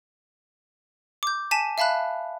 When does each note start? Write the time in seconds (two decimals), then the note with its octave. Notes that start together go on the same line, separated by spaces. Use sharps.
1.23 D6 G6
1.51 G#5 A5 B6 D#7 E7
1.78 E5 F5 A5 B5 F#6